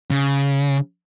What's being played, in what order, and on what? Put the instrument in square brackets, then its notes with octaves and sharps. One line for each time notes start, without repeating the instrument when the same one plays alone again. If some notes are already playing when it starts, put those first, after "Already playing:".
[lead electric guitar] C#3